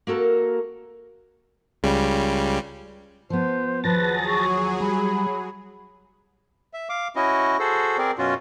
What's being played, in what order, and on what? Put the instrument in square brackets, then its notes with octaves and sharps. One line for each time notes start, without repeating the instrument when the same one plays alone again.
[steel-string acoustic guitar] A#3 F#4 A4 A#4
[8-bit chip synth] C#2 C#3 G3
[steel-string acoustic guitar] F3 B3 [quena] C5
[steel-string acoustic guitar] D#2 F3 [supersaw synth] F#3 G#4 [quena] B4 [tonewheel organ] A5 A6 A#6
[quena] C#6
[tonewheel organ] G3 [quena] B5
[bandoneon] E5
F5 D6
C#4 E4 F#4 D#5
F#4 G#4 A4 C5
C4 G#4 A#4 D5
F#2 B2 C#4 F4 F#4